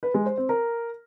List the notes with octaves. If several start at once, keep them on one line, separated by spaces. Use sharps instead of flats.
B4
G#3
C5
C4
A#4